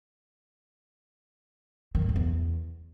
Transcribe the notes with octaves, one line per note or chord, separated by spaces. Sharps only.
D#3
A2
F#2
E2